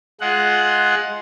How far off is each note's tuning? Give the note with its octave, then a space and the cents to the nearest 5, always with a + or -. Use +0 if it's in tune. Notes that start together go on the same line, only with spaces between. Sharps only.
G#3 +15 F4 +0 F#5 +0